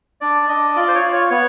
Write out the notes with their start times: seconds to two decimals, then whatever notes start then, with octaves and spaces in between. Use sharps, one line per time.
0.21 D4 D5
0.48 D4 D#5
0.76 F4 D5
0.88 C5
0.95 C#5
1.03 F4
1.12 C#5
1.30 B3 C#5